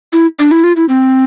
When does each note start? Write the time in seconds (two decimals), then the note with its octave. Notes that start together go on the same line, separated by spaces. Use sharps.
0.13 E4
0.39 D4
0.51 E4
0.64 F4
0.76 E4
0.89 C4